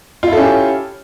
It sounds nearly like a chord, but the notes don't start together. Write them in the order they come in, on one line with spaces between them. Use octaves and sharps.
F4 E4 A4 C#4 G4